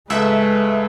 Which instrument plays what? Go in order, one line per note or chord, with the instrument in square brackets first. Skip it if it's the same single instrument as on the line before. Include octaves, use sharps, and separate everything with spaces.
[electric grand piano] C#2 [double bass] G#3 [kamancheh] A3 B4 [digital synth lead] E5